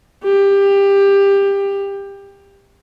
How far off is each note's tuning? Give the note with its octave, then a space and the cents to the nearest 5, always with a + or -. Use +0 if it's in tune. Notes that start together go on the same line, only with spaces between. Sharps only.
G4 +20